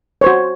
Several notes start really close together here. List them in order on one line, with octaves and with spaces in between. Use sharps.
C#5 C5 F#4